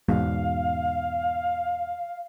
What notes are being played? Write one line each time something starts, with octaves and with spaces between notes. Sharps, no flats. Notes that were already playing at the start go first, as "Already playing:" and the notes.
E2 G#2 B2 F5